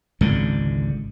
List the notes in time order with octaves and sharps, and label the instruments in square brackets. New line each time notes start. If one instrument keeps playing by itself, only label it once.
[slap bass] G#1 C#2 G#2 D3